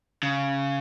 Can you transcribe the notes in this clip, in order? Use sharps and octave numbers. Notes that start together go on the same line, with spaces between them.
C#3